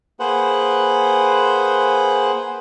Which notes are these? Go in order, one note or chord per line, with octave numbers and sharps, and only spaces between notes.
A#3 G#4 B4 C5 F#5